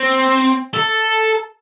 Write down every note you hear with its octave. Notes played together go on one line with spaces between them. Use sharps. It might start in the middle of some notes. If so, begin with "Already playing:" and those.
Already playing: C4
A4